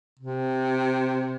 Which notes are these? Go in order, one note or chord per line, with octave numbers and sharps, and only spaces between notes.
C3